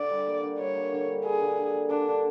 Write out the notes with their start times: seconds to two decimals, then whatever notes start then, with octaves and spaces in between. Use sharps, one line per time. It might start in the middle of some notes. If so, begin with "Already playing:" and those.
Already playing: D3 D5
0.10 G3
0.27 A#3
0.42 D3
0.59 G3 C#5
0.76 A#3
0.93 D3
1.08 G3
1.25 G3 G#4
1.41 D3
1.58 D3
1.74 A#3
1.90 D3 D4
2.08 D3